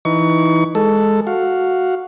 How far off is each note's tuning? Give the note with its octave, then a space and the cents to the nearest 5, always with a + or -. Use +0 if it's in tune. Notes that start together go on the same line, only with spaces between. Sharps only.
E3 +0 D#4 +0 C#6 +25
G#3 +0 A4 +5
F#4 +0 F5 +0